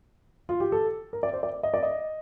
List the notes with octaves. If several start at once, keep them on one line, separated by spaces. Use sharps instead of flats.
F4
G4
A4
A#4
D5
C5
D5
D#5
D5
D#5